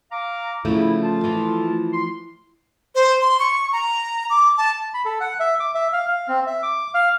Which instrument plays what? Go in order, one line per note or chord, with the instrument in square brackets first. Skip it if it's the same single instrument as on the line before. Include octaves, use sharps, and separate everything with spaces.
[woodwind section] F5 A#5 D6
[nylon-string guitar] C#3 F3 [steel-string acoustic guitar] A3 [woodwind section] E4
[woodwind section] F4 A5
[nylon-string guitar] E3 F3
[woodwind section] C6
[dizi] C5
C6
C#6
A#5
D6
A5
[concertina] B5
A4
F#5
E5
D6
E5
F5
F5
C4
E5
D6
F5